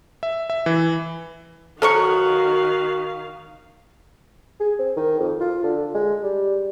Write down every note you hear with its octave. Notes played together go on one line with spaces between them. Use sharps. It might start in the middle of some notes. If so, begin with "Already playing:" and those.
E5
E5
E3
D#3 F3 F#3 F#4 A4 F5 C#6
G#4
C4
D#3
F2
F4
D3
G#3
G3